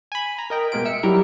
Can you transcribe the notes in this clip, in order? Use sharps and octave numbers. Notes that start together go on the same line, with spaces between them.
G#5 B5
A#5
A#4 D#5 G5
B2 G#3 A#3 F4 D7
E5 E6 C#7
F#3 G3 E4 G4 A#4